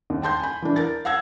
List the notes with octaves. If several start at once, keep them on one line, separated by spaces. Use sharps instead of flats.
D#2
G5 A5 C6 G6
G#5 B5
E3 D4
A#4 A6
F5 F#5 E6 G#6